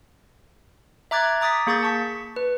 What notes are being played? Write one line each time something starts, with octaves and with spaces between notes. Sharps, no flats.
E5 A#5 D6 F#6 G#6 A6
A#5 D6 D#6 A6 B6
A#3 G#4 C#6 G6 A6
A5 C#6 B6
B4